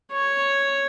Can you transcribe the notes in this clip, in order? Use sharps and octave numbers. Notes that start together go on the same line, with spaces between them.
C#5